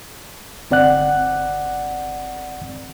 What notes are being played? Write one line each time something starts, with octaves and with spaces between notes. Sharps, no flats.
G1 C4 D5 F#5 F#6